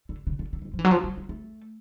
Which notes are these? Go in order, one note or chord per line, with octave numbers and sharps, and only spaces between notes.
D3
C#3
D3
D3
E3
D#3
F3
E3
F#3
F3
F#3
G#3
A3